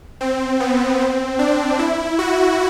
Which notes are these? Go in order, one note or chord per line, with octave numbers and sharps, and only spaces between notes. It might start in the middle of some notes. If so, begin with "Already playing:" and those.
C4
B3
C4
D4
E4
F#4